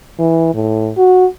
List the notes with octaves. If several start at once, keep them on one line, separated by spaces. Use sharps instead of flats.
E3
A2
F#4